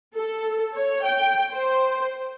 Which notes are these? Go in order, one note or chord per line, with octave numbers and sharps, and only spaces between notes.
A4
C#5
G5
C5